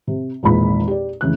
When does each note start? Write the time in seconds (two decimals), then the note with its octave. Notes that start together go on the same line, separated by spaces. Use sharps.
0.07 C3
0.43 G#1 E2 A#2 B5
0.88 G4 D5
1.21 F1 C#3 E3 F#6